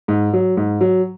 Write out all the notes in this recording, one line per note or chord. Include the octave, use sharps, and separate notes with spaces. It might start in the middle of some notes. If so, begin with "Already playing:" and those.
G#2
F#3
G#2
F#3